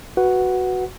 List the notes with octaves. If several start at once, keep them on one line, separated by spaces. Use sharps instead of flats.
F#4 B4 F#5